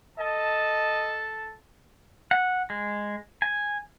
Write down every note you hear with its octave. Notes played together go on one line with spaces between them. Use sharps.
A4 D#5 A5
F#5
G#3
G#5